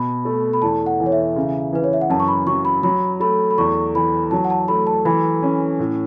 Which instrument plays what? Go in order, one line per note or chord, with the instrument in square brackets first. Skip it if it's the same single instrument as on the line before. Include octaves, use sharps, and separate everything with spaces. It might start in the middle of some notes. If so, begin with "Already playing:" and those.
Already playing: [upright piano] B2 [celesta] B5
[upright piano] A3
[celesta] B5
[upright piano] E2 [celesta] A5
[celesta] F#5
[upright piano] E3
[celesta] C#5
E5
[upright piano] C#3
[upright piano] E3 [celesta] B4
[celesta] C#5
E5
F#5
[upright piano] F#2 [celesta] A5
[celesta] C#6
B5
[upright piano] F#3 [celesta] C#6
[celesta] B5
[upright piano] F#3 [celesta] B5
[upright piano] A3 [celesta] B5
[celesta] B5
[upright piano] E2 [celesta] C#6
[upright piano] E3 [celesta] B5
[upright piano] F#3 [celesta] A5
[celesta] F#5
A5
[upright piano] A3 [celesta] B5
[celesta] A5
[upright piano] E3 [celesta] B5
[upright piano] C#4
A2